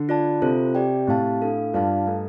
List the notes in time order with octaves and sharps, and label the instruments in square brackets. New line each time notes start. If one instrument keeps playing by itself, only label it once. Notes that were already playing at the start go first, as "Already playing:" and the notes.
Already playing: [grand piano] D3
[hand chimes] F4 D5 A5
[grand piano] C3 [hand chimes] F4 A4 C5
[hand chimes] G4 D5 G5
[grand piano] A2 [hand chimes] C4 G4 F5 A5
[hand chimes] D4 A4 F5
[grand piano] G2 [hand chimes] F4 D5 F5 A5
[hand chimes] A3 D4 A4